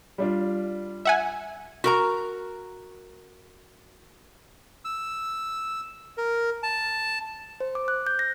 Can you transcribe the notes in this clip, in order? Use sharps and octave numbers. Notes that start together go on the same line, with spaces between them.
G3 D4 F4
E5 F#5 G#5
F#4 A#4 A#5
E6
A#4
A5
C5
D6
F#6
G6
A#6